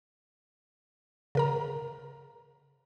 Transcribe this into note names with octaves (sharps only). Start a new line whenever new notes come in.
C#3 A#4 A#5